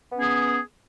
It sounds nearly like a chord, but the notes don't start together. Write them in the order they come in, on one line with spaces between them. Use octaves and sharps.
B3 C#4 G#4